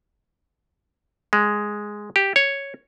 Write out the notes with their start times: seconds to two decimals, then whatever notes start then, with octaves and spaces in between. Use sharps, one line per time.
1.33 G#3
2.16 G4
2.36 C#5